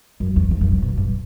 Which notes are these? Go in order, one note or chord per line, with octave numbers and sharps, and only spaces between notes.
F#2
E2
E2
F#2
A2
B2
G2